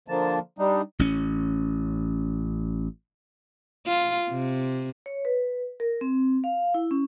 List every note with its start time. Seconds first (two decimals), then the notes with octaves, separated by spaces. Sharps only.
0.08 D3 F3 A#3 A5
0.59 G3 D4 D#4
0.99 A1 C#4
3.86 F4
4.30 C3
5.06 C#5
5.25 B4
5.80 A#4
6.01 C4
6.44 F5
6.74 E4
6.91 C#4